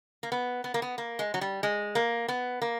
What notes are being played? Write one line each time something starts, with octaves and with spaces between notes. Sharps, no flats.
A#3
B3
B3
A#3
B3
A#3
G#3
F#3
G3
G#3
A#3
B3
A#3